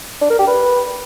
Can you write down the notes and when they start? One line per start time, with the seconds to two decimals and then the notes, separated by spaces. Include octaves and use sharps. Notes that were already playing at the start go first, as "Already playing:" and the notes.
0.21 D4
0.30 A#4
0.39 G4
0.47 B4